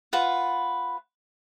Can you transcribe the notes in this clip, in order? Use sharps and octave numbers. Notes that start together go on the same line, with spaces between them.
F4 B4 F#5